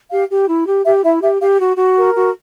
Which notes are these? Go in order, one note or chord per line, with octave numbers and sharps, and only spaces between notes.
G4 F5
G4
E4
G4
G4 E5
E4 E5
G4 E5
G4 F5
F#4
F#4
A#4
F#4